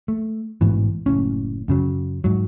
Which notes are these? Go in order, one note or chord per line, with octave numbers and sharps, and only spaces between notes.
A3
A1 G#2 B2 E3
F#1 B1 A2 C#4
F#2 C#3 F#3
G#2 F#3